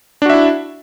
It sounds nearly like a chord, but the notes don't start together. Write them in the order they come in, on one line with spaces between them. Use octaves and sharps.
D4 F#4 E5 E4